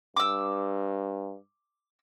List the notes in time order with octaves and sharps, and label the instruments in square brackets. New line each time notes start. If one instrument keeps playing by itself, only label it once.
[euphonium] G2 [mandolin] D6 E6